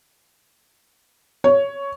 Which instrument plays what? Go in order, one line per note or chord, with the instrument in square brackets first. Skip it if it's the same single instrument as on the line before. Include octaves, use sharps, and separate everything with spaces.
[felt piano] C#5